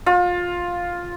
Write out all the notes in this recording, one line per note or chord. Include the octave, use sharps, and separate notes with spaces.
F4